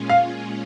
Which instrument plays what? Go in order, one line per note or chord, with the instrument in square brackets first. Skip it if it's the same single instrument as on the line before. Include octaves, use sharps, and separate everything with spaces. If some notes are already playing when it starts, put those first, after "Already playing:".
Already playing: [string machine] A#2 G#3 C#4 F4 G#4
[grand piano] F5